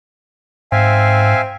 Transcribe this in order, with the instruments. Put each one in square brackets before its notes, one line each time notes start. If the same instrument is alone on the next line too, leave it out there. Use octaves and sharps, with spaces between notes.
[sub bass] G#2 [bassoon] C4 [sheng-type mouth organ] E5 F5 G#5